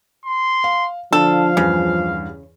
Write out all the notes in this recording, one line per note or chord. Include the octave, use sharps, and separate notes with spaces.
C6
F5
D3 F3 D4 A4 F5
E2 G2 C#3 E3